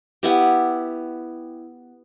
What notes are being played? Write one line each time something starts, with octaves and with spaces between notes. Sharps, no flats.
B3 E4 G4